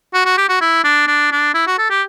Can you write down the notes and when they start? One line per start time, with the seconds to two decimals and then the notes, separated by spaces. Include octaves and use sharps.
0.14 F#4
0.25 F#4
0.38 G4
0.49 F#4
0.61 E4
0.84 D4
1.07 D4
1.32 D4
1.54 E4
1.67 F#4
1.78 A4
1.90 G4